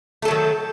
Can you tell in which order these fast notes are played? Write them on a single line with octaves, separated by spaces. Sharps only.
A3 A4 F#3 D#3